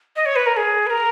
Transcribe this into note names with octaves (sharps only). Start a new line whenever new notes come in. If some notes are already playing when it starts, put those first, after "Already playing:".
D#5
C#5
B4
A#4
G#4
B4
A#4